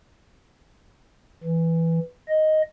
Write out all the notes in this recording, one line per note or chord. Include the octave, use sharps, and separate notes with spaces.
E3
D#5